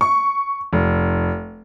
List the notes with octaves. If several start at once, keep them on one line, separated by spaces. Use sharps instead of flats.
C#6
F1